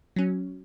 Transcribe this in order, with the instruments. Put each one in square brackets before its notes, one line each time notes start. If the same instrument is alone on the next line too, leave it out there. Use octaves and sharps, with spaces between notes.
[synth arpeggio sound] F#3 C#4